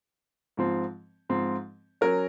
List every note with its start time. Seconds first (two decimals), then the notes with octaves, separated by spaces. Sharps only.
0.57 G#2 F3 C4
1.29 G#2 F3 C4
2.01 F#3 C#4 A#4